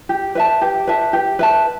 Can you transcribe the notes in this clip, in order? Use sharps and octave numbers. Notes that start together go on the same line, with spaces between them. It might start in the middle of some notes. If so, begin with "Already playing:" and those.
G4
B4 E5 A5
G4
B4 E5 A5
G4
B4 E5 A5